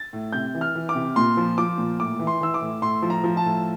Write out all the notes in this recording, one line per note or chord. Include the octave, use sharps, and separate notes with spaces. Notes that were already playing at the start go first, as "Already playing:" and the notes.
Already playing: A6
A2
C3 G6
E3
F6
E3
D6
C3
A#2 C6
F3
F3 D6
A#2
A2 D6
E3
C6
E3 E6
D6
A2
A2 C6
F3
A#5
F3
A5
A2